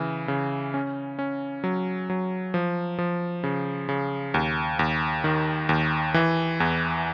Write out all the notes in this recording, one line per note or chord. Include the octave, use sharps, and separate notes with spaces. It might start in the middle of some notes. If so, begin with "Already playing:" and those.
Already playing: C#3 E3
C#3
C#4
C#4
F#3
F#3
F3
F3
C#3
C#3
D#2
D#2
D#3
D#2
E3
E2